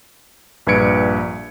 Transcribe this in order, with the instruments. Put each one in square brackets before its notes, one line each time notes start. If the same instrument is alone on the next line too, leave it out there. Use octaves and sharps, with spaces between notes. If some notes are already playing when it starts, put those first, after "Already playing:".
[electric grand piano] A#1 G2 B4 G#6 C#7 D7